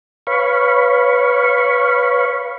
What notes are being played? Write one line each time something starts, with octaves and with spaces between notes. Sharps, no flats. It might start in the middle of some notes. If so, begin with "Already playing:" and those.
B4 C#5 F5 B5 C#6